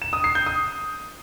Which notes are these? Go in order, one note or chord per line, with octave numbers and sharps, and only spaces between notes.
E7
D#6
C7
G6
D#6